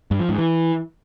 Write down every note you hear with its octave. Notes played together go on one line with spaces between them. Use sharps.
G2
F3
G#2
E3